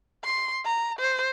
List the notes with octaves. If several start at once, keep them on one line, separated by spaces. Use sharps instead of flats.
C6
A#5
C5